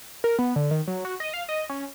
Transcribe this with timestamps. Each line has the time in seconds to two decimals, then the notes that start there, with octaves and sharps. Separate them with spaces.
0.24 A#4
0.39 B3
0.56 D3
0.71 D#3
0.87 F#3
1.05 F#4
1.20 D#5
1.34 F5
1.49 D#5
1.70 C#4